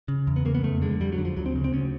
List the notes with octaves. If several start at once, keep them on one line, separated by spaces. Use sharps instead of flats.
C#3
E2
B3
C#3 A#3
B3
F2 A3
D3 G#3
F2 G3
F#3
D3
F3
D2 F#3
C4
C#3
C4
D2 C#4